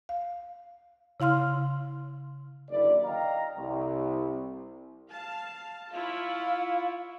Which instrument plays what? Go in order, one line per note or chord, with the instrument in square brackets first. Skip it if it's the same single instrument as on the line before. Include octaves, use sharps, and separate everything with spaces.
[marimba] F5
C#3 E4 F5 C6 F6
[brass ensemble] F#1 D#2 D3 E4 D5
D#5 F5 G5 A#5
C2
[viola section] F5 A5
[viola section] E4 F4 C#5 [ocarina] F5